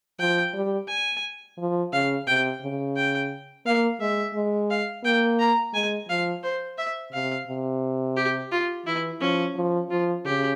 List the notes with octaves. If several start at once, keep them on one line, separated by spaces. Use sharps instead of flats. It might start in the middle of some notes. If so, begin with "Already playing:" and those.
F3 G5
G3
G#5
F3
C#3 F5
C3 G5
C#3
G5
A#3 F5
G#3 E5
G#3
F5
A#3 G5
A#5
G#3 G#5
F3 F5
C5
E5
C3 F5
C3
G4
F4
E3 E4
F3 C#4
F3
F3 F4
C#3 G4